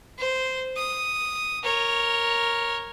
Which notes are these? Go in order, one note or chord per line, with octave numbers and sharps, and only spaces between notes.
C5
D#6
A#4 C#5